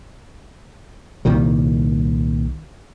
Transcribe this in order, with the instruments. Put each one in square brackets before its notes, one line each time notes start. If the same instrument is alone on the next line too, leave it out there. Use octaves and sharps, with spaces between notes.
[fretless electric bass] C2 A#2 D#3 G3